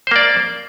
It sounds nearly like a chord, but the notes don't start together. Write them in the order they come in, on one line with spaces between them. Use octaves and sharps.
C5 A#3 D5